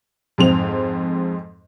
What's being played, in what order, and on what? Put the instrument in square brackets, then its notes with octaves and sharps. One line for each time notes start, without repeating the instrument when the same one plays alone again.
[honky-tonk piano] F2 G#2 C4 F7